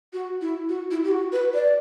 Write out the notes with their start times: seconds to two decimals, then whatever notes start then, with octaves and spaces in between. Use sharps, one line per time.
0.13 F#4
0.41 E4
0.69 F#4
0.91 E4
1.04 G4
1.11 F#4
1.32 B4
1.54 D5